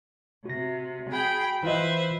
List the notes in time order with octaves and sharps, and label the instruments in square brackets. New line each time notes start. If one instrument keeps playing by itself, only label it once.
[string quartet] C3 [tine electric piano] F#4 A#6
[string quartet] G#4 G5 B5
[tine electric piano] E3 F4 D#5 [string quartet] B4 C5 E5